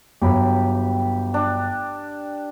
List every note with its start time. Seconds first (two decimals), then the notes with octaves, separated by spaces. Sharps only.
0.22 G1 F#3 G4 B5
1.34 D4